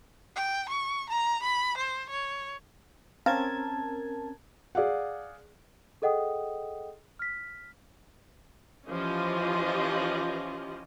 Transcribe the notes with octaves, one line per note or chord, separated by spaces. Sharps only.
G5
C#6
A#5
B5
C5
C#5
C4 C#4 A#4 F5 A5 G#6
G#4 D5 F5 F#5
G#4 A4 D#5 F#5 G5 D#6
F6 B6
E3 F3 C#4 F4 G4 D#5